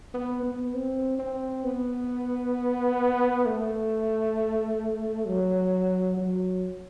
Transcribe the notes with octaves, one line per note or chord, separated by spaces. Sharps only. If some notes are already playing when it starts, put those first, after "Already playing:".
B3
B3
C4
C4
B3
A3
F#3
F#3